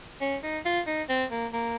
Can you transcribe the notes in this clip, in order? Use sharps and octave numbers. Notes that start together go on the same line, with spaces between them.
C#4
D#4
F4
D#4
C4
A#3
A#3